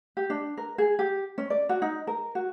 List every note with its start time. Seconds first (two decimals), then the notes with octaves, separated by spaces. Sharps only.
0.17 G4
0.30 D4
0.57 A#4
0.78 G#4
0.99 G4
1.38 C#4
1.50 D5
1.69 F#4
1.82 D#4
2.07 A#4
2.35 F#4